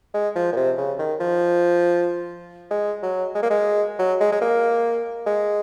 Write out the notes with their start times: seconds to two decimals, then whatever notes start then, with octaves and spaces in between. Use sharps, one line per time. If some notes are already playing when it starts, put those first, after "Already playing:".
0.14 G#3
0.36 F3
0.53 A#2
0.57 C3
0.78 C#3
0.99 D#3
1.20 F3
2.71 G#3
3.03 F#3
3.35 G#3
3.43 A#3
3.51 G#3
3.99 F#3
4.20 G#3
4.32 G#3
4.41 A#3
5.26 G#3